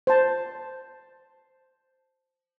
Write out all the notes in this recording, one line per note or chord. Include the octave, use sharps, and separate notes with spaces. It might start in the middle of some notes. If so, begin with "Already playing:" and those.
C5 A5